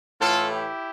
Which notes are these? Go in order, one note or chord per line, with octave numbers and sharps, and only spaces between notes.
A2 E3 F4 A4
E4 G4